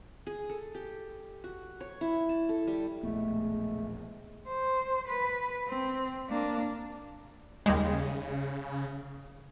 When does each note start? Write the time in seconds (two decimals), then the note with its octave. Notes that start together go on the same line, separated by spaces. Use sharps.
0.27 G#4
0.50 A4
0.75 G4
1.44 F#4
1.80 C#5
2.01 E4
2.29 A5
2.49 A4
2.67 G3
3.03 E1 A#1 G#3 A3 B3
4.47 C5
5.08 B4
5.68 C4
6.28 A#3 D4
7.66 D#2 C#3 G3 G#3